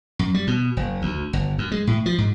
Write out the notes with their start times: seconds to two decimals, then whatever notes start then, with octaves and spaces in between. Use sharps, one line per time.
0.19 F#2
0.34 G3
0.47 B2
0.77 F#1
1.02 D2
1.33 G1
1.58 F#2
1.72 G#3
1.87 A2
2.06 F3
2.18 G#2